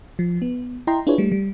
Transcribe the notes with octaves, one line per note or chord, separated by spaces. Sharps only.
F3
B3
E4 D#5 G5 A#5 C6
D4 E4 F4 G#4 B4 C#5
G3 A3
G3